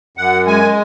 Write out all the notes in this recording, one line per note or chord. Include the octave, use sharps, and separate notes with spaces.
F#2 F#5
G#3 G#5